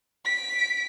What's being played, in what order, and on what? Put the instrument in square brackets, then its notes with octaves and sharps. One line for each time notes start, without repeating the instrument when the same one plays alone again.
[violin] B6 D7